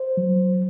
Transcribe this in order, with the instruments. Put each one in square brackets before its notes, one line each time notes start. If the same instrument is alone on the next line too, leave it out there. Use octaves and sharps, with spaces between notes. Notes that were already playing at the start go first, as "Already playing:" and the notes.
Already playing: [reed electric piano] C5
F#3